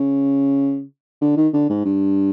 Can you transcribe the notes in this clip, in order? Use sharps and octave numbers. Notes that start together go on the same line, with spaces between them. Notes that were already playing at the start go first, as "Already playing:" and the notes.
Already playing: C#3
D3
D#3
D3
G#2
G2